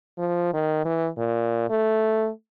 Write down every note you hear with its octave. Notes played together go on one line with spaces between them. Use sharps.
F3
D#3
E3
A#2
A3